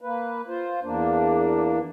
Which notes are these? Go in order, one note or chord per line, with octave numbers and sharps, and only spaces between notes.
A#3 B4
F4 C5
E2 A#3 D4